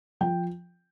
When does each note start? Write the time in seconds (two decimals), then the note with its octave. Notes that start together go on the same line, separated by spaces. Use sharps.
0.21 F3 G5